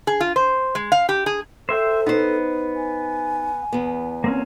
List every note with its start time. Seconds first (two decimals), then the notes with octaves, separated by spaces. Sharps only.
0.07 G#4
0.20 F4
0.36 C5
0.75 G#3
0.92 F5
1.09 G4
1.26 G#4
1.69 A4 C5 E5 G5
2.06 B3 D#4 C5
2.76 G#5
3.73 E2 B3
4.24 A#3 C4 C#4